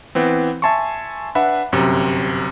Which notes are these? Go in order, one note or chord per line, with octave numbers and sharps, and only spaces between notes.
E3 B3 C4
E5 G#5 A5 C6 C#6
D4 B4 E5 F#5 B5
G1 F#2 C3